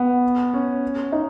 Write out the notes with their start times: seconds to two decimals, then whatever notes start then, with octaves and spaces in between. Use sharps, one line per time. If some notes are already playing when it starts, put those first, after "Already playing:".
Already playing: B3
0.54 C#4
1.12 D#4